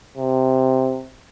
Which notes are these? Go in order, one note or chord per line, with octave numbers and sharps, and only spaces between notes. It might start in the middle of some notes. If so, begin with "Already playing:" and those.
C3